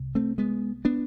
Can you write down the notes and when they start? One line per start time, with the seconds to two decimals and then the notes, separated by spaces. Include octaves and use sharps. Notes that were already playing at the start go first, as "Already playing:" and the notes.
Already playing: C2 C3
0.15 A3 C4
0.38 G#3 B3
0.85 B3 D4